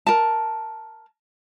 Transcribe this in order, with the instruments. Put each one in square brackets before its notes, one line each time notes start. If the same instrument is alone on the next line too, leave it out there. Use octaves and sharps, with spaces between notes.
[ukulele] A#4 A5